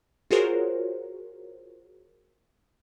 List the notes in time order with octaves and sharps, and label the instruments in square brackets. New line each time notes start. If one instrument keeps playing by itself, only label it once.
[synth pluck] F4 F#4 G#4 A#4 C5 C#5